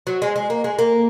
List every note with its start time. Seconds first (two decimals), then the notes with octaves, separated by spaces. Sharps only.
0.07 F#3
0.22 G#3
0.36 G#3
0.50 A#3
0.64 G#3
0.79 A#3